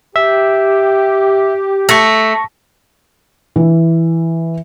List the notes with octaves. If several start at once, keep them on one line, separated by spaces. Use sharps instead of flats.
G4 E5
A3 C#6 A#6
E3